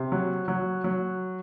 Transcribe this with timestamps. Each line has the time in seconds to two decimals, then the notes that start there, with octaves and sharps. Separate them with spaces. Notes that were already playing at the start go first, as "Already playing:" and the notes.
Already playing: C3
0.12 F#3
0.48 F#3
0.84 F#3